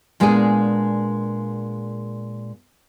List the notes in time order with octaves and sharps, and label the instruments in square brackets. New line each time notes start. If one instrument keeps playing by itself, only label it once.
[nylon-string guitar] A#2 G#3 A#3 B3 D4 G#4